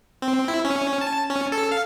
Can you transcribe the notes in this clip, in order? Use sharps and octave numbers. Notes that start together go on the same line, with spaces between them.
C4
E4
C#4
A5
C#4
A4
F5